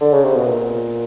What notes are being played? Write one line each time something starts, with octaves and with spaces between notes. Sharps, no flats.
D3
C#3
C3
B2
A#2